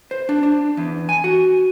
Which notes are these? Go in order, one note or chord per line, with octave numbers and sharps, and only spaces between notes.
C5
D4
D4
E2
G#5
F#4